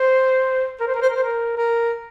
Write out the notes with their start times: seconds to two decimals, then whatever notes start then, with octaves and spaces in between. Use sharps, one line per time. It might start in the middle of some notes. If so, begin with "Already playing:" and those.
Already playing: C5
0.80 A#4
0.87 C5
0.95 A#4
1.02 C5
1.09 A#4
1.16 C5
1.23 A#4
1.57 A#4